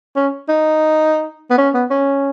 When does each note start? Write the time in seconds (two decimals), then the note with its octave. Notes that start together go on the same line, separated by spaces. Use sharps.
0.16 C#4
0.49 D#4
1.50 B3
1.58 C#4
1.74 B3
1.91 C#4